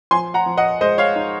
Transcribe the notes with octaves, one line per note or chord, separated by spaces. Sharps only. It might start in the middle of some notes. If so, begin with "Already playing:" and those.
F3 G#5 C6
F#5 A#5
F3
D#5 F#5
G#3 C5 D#5
C#5 F5
D#4